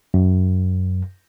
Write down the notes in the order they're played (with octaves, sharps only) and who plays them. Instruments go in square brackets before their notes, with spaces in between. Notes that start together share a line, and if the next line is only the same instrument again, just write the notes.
[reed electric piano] F#2